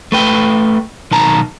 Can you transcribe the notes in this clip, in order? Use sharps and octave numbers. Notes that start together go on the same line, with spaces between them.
A3 B4 G5
B1 D#3 A5 A#5